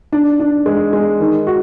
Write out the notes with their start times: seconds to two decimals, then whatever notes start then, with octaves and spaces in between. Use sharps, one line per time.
0.12 D4
0.40 D4
0.66 G#3
0.93 G#3
1.20 D#3
1.47 F#4